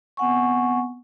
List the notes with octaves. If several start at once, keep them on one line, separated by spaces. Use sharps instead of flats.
B3 C4 F#5 G#5 C#6